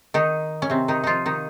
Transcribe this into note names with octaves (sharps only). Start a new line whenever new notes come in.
D#3 D#4
C#4
C3 C4
D#3 D#4
F3 D#4 F4
D#3 D#4